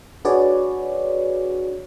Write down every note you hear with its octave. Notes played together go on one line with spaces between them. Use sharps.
D4 F#4 G#4 B4 C#5 D5